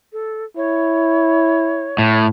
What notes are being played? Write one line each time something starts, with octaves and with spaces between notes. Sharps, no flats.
A4
E4 C#5
A2